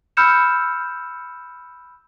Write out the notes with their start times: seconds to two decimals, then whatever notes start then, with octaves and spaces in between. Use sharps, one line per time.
0.17 B5 E6 F6 G6 C#7 E7